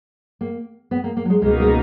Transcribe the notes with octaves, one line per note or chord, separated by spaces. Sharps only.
A#3
B3
A#3
A#3
F#3
G#3
C#2 B2 G#3 A#3 D#4
G#3